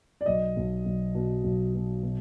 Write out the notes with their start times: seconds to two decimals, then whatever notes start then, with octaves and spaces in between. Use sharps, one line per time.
0.21 D5
0.26 B1 D#5
0.56 B1
0.86 B1
1.15 B2
1.44 B1
1.74 B2
2.03 B2